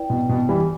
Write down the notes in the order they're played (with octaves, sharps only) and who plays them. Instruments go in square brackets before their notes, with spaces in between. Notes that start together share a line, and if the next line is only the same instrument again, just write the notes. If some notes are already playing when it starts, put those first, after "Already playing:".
Already playing: [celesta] E4 B4 D5 G5
[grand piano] B2
B2
E3 G3